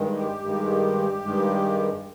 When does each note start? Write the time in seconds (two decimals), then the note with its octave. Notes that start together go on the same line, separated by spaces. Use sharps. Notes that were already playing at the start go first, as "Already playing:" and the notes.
Already playing: G2 D#3 G#3
0.16 G4
0.44 G2 D#3 G#3
1.25 G2 D#3 G#3